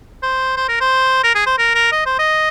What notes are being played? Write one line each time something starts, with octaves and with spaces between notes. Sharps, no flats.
C5
C5
A#4
C5
A#4
G#4
C5
A#4
A#4
D#5
C5
D#5